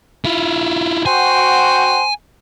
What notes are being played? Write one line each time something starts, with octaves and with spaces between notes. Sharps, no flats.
E4 F4
F#4 C5 G5 G#5